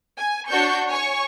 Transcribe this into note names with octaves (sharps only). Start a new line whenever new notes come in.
G#5
D4 F#4 C#5 C#6 G6
C#5 G#5 C#6